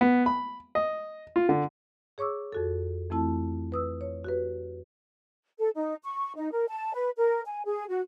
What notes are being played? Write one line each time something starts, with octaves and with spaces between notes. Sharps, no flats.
B3
B5
D#5
F4
D3
G#4 C#5 C#6 D6 E6
F2 F#4 A4
F2 E3 A3 C4 E4 A5
B4 D#6 E6
C#5
F#4 G4 B4
A4
D#4
C#6
D#4
A#4
A5
B4
A#4
G#5
G#4
F#4